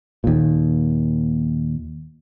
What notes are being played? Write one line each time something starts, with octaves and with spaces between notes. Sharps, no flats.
D#2 A#2